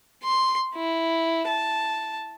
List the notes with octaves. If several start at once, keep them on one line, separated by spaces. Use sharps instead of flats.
C6
E4
A5